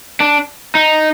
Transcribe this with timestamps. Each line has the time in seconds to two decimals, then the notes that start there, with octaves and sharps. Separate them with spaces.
0.20 D4
0.75 D#4